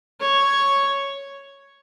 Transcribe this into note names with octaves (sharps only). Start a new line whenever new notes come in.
C#5